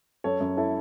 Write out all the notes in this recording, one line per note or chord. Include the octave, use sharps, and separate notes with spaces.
F#2 A4 C#5
F#2
E4 A4